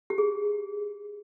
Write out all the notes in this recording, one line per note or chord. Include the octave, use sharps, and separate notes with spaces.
G4
G#4